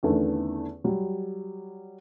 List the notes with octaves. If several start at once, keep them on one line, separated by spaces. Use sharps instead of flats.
E2 D3 D#3 A3 B3 C#4
F#3 G3